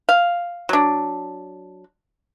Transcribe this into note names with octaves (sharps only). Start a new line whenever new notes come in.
F5
F#3 D4